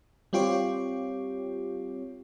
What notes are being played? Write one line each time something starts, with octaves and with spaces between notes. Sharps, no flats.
G3 C4 F4 G4 C#5